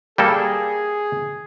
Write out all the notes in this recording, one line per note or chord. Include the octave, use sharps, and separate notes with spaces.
G3 A#3 G#4 A4